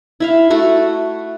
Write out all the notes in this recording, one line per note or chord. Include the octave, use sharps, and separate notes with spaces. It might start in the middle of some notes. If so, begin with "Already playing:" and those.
E4 E5 F5
A3 F#4 A4